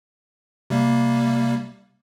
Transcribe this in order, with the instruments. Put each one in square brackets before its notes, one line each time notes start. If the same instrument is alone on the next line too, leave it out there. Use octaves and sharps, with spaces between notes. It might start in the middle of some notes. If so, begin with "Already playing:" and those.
[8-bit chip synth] C3 G3 A#3